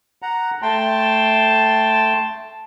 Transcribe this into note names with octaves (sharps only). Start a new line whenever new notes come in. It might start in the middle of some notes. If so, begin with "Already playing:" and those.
F#5 A#5
A3 G5 A5 C6